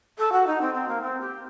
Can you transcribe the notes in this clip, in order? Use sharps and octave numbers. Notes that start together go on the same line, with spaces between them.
A4
F#4
D#4
C4
C4
A#3
C4
G4